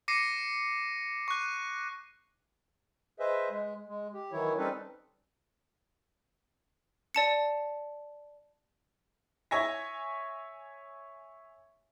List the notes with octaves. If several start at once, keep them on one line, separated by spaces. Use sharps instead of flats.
D6 A#6 C7 C#7 D#7
C#6 F#6
G#4 B4 C5 D#5 E5
G#3
G#3
G4
D#3 E3 F#3 E4 C#5
G3 C4 C#4 D#4 A4 B4
D5 A5 C#7
C#5 E5 G#5 C#6 A#6